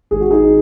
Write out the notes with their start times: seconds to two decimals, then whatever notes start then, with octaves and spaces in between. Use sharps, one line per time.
0.11 G#1 G#4
0.21 F#4
0.30 D#4 G#4